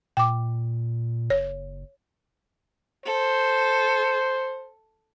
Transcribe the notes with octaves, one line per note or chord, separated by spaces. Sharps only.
A#2 G5 D6
F#1 C#5
A4 C5